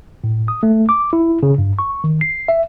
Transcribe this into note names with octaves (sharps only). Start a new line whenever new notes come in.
A2
D#6
A3
D6
E4
C#3
G2
C#6
D#3
C7
E5